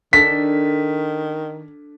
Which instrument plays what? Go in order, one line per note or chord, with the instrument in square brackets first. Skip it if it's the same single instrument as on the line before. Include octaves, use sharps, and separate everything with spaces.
[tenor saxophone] D#3 [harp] D4 A4 [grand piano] B6